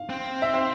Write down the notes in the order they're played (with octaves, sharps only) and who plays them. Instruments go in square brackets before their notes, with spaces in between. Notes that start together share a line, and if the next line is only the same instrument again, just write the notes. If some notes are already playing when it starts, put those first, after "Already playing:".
Already playing: [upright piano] F5
[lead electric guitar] C4
[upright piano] E5
C5